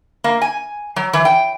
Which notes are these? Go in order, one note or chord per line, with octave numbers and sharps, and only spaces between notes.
A#3
G#5
F#3
E3
G5